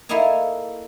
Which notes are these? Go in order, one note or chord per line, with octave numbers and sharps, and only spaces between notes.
A#3 E4 A4 D#5 G#5 A#5